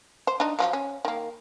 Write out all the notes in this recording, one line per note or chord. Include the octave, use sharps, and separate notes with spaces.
C5
D4 D#4
F3 F#3 A#3
C#4
D#3 A#3